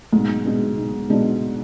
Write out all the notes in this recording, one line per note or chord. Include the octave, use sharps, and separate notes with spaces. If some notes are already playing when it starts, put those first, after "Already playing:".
B1 G#2
B2 G#3 D4
B1
B2 G#3 D4